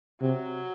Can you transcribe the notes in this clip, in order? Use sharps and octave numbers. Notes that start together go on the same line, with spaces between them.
C3 F#3